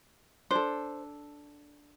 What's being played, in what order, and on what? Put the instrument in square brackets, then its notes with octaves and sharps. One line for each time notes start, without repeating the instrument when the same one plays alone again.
[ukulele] D4 A4 C5